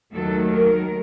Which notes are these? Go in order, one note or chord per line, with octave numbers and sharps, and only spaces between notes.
D#2 D#3 F#3 A3 A4
A#4